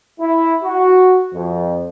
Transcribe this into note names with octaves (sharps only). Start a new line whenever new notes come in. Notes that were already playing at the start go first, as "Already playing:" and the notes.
E4
F#4
F2